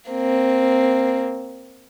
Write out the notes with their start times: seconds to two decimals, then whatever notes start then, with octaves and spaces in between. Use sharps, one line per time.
0.11 A#3 C4